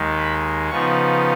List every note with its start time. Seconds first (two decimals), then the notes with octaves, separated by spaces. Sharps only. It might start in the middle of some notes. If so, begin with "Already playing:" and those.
Already playing: D#2 D#3 G#3
0.17 B5
0.70 C#3 F3 B3 D#4 C#6